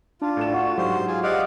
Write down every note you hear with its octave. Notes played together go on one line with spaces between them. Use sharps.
D4 F4
A2 A4 E7
F#4
G#2 F#3 G4 C5
F4 G#4
G4 C5 D5 D#5 F5 F#5